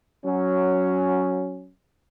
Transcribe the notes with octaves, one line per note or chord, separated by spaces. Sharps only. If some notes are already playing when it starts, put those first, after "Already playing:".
F#3 C#4